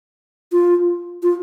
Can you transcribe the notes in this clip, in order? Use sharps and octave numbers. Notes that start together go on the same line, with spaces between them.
F4
F4